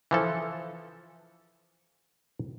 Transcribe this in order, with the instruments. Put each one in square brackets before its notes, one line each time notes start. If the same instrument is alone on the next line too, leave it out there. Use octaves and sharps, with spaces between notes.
[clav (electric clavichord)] E3 F3 A4